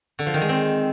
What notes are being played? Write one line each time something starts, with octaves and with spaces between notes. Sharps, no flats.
D3
F3
D#3
G#3
C4